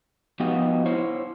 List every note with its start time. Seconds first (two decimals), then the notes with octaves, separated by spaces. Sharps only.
0.40 F3 B3 D#4 F#4 G4 D#5
0.86 E4 C5 C#5